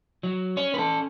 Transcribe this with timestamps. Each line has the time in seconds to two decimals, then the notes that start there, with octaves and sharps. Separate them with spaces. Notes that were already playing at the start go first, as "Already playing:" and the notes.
0.23 F#3
0.57 C#4 C#5
0.74 B4
0.78 A4